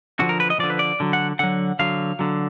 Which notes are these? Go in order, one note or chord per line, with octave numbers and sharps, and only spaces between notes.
D3 F3 F#4
A#4
B4
D#5
D3 F3 D5
B4
D5
D3 F#3
F#5
D3 F#3 F#5
D3 F#3 F5
D3 F#3